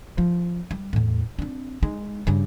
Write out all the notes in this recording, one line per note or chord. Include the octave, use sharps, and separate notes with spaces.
F3
G3
E2 A2
C4 D4
G#3 D#4
G2 C#3